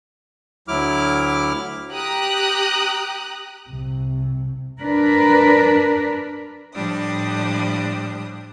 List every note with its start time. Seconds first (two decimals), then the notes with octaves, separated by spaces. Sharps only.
0.68 D2 F#3 E4 D6 F6
1.92 G4 A#5 D#6 F#6
3.69 C2 C3
4.81 D4 A#4 B4
6.74 A2 F3 G3 D4 D#6